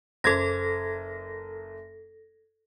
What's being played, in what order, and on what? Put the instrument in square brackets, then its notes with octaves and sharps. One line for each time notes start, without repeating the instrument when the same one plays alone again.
[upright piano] F#1 C5 G#6 [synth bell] A4 A#6